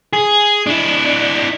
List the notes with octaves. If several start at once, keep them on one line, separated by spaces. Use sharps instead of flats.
G#4
D4 E4